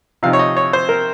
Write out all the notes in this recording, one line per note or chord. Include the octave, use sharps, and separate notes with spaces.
C3 F3 C4 D#4 F5
C#5
D#5
C#5
C5
A#4